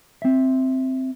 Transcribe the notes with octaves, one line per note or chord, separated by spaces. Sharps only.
C4 E5